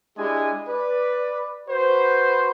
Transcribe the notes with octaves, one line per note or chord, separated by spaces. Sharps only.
G#3 D4 E4 G4 G#5
B4 D5
F#4 B4 C5